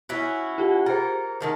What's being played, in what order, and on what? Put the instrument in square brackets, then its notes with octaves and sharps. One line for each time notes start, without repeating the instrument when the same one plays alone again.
[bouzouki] C#4 E4 F#4
[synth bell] F4 G4 F#5
[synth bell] G#4 C5 [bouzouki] A#4
[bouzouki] D3 D#3 A4